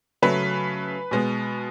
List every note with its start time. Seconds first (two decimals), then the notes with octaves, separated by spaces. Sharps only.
0.22 C#3 F#3 A3 B4
1.11 B2 G#3 B3